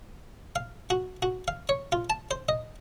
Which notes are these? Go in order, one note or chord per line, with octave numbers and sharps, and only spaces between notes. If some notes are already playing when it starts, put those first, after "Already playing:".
F5
F#4
F#4
F5
C#5
F4
A5
C5
D#5